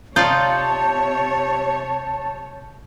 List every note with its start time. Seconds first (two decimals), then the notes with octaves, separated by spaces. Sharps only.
0.16 C3 D#4 F4 C#5 D5 A5 G6